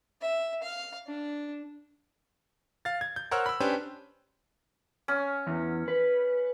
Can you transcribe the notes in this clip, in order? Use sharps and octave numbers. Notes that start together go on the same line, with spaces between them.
E5
F5
D4
F5 A6
G#6
G6
A#4 C5 C#5 F#5 E6 F6
B5 E6
C#4 D4 G4 B4 C5
C#4
E2
B4